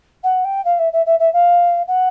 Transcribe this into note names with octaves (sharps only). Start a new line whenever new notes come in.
F#5
G5
F5
E5
E5
E5
E5
F5
F#5